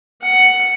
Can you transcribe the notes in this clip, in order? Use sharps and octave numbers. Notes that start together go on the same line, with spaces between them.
F#5